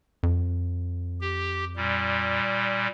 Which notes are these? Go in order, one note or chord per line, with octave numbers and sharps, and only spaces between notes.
F2
G4
A#2 G3